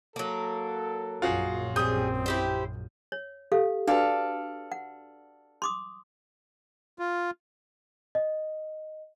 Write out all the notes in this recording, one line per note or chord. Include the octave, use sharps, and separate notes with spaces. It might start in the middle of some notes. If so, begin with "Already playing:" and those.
F#3 A#3 A4
A#1 F#2 F4 F#4 G#4
G3 C4 G#4 D#6 G6
E4 G4 C5
C#5
G4 A4 F5
D4 F#4 A4 B4 D5 F5
F#5
C6 D6 D#6
F4
D#5